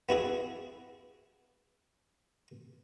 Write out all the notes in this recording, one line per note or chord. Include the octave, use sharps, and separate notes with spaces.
B3 E4 F#4 G#4